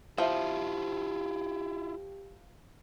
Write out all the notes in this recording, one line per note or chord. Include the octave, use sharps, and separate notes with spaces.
F3 E4 F4 G4 C5 E5